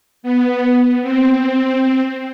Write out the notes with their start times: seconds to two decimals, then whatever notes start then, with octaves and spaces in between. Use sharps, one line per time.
0.23 B3
1.02 C4